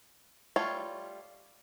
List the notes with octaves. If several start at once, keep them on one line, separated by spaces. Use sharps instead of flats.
G3 A3 F4 C#5